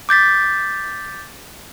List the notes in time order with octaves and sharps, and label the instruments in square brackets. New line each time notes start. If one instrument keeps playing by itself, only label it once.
[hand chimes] D6 G6 A6 B6